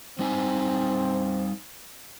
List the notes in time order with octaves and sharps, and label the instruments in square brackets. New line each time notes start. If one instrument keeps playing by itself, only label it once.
[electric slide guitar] G3 D#4 G#5 [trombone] C4